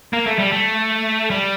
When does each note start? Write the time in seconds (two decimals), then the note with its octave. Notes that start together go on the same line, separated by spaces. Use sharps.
0.13 A#3
0.27 A3
0.39 G3
0.52 A3
1.31 G3